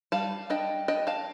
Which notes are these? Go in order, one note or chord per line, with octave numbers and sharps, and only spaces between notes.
G3 F5 A5
D4 D#5 G5
D4 D#5 G5
F5 A5